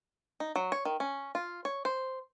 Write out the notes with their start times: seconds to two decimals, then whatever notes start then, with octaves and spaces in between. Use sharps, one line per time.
0.40 D#4
0.56 F#3
0.72 C#5
0.85 D#3
1.00 C#4
1.35 F4
1.65 C#5
1.85 C5